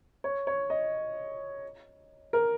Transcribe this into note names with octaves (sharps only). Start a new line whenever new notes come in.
C#5
C#5
D#5
A#4